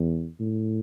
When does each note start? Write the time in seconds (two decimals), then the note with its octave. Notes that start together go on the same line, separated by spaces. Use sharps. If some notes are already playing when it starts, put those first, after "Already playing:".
Already playing: E2
0.40 A2